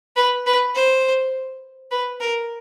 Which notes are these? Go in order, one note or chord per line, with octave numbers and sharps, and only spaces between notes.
B4
B4
C5
B4
A#4